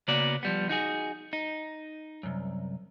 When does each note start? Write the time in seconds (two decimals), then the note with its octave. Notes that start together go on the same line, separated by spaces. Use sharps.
0.08 C#3 A#3 B3 F#4 D5
0.43 F3 G3 B3
0.69 D#4 F#4 G#4
1.33 D#4
2.23 C2 F#2